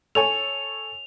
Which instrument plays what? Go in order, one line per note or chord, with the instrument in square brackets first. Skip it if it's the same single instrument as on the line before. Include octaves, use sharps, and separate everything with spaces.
[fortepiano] A4 C#5 G#5 [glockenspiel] F7